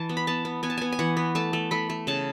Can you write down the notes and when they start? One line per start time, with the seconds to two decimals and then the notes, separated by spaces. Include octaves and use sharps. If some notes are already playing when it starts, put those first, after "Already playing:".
Already playing: E3 A5
0.09 B3
0.17 B5
0.27 B3 A5
0.45 B3
0.63 B3 G#5
0.70 A5
0.78 B3 G#5
0.92 G#5
0.99 E3 F#5
1.17 B3
1.35 A3 A5
1.53 A3
1.71 A3 B5
1.90 A3
2.07 C#3 A5